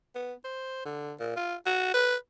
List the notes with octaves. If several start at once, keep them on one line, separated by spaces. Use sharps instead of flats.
B3
C5
D3
A#2
F4
F#4
B4